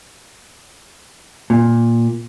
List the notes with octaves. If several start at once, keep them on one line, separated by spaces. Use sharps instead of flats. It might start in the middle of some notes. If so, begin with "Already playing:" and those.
A#2